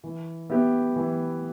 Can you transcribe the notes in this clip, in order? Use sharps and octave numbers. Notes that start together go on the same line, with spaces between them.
E3
B3 E4 G4
E3